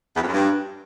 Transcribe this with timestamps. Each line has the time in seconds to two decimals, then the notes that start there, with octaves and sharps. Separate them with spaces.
0.16 E2
0.22 F2
0.28 F#2
0.34 G2